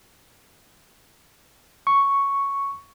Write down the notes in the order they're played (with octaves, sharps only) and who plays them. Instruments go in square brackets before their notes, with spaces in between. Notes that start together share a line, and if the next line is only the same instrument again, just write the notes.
[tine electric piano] C#6